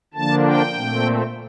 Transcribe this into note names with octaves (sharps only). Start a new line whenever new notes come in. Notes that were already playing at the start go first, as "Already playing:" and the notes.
D3 F3 A#3 D4 A5
G5
A#2 A3 C4